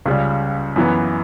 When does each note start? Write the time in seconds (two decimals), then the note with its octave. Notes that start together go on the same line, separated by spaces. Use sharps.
0.06 C#2 C#3 G3
0.76 F#2 E3 B3